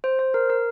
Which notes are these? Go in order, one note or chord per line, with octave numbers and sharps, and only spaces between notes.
C5
C5
A#4
A#4